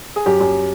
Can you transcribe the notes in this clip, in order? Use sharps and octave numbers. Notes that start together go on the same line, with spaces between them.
G#4
F#2 G4
F#2